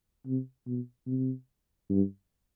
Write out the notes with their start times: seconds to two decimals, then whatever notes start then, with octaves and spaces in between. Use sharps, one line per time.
0.26 C3
0.67 B2
1.07 C3
1.90 G2